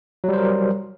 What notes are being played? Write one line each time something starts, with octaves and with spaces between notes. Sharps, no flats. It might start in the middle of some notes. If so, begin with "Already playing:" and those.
F#3 G3 A#4 C5